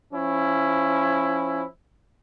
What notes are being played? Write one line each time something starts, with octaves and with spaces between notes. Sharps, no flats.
F3 C#4 E4